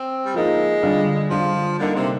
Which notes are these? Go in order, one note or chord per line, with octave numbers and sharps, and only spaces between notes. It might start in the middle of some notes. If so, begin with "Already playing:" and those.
Already playing: C4
G3
F3 G#3 A#3 D#4
D3 G3 D4 F4
D3 F3 G3 D4 F4
D3 G3 A#3 D#4
C3